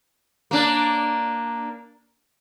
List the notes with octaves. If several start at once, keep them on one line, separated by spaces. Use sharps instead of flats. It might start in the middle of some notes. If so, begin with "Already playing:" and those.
A#3 D4